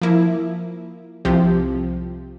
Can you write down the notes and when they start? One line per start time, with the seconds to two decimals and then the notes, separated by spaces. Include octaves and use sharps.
0.02 F3 A#3 E4
1.25 C2 C3 F3 C4 G4